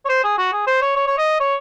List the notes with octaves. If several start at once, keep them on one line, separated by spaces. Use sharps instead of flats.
C#5
C5
G#4
F#4
G#4
C5
C#5
C#5
C#5
D#5
C#5